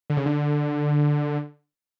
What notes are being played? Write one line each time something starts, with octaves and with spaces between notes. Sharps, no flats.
D3
C#3
D3